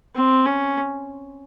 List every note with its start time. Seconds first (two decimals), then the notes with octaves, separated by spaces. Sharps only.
0.15 C4
0.46 C#4